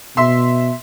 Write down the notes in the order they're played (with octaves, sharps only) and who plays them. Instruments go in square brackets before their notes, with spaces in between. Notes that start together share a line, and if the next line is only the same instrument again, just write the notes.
[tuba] B2 [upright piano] E5 C6